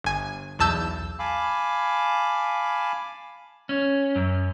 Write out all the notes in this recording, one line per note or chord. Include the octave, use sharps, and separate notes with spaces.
G1 G#5
B1 E2 A5 E6 G6
F5 G#5 A5 B5 D6
C#4
F#2